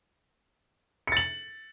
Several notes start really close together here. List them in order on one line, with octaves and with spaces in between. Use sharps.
C#7 A6 F#7